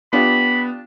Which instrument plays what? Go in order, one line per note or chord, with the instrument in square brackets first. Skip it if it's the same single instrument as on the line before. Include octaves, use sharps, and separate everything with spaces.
[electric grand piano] B3 [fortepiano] D4 F4 G4 [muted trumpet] B5